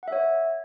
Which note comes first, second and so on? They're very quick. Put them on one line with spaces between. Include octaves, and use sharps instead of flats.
F#5 E5 C#5